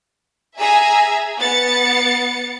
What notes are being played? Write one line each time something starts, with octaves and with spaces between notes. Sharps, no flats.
G#4 E5 G#5 A#5 E6
B3 A6 C#7